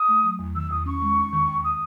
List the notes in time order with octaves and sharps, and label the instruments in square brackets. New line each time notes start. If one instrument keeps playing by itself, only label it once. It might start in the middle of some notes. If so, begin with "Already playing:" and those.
Already playing: [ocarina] D#6
[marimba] A3
F#3
E2
[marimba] D#3 [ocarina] E6
[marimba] E2 [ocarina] D#6
[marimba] C#4 [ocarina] C#6
[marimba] G#3
D#2
D#3
D#2
[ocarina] D#6